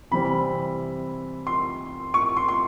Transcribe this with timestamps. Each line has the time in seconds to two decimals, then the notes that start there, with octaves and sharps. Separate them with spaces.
0.11 C3 E3 G3 C4 B5
1.47 C6
2.14 C#6
2.37 C6
2.48 C6